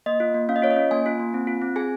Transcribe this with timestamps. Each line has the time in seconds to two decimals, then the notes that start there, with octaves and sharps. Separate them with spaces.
0.06 A#3 D#5
0.20 F4
0.34 A#3
0.49 C#4 F5
0.56 D#5
0.62 F4 C#5
0.71 D#5
0.76 C#4
0.91 A#3 G#5
1.06 F4
1.20 A#3
1.34 C4
1.47 F4
1.62 C4
1.76 G#4 G#5